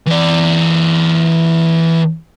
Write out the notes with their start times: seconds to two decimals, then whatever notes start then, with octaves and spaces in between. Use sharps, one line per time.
0.06 E3 D5